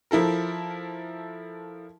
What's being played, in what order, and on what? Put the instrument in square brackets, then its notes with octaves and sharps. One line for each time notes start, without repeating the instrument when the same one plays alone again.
[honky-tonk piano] F3 E4 A4 A#4